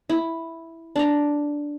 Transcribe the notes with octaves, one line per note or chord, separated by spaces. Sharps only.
E4
D4 A#5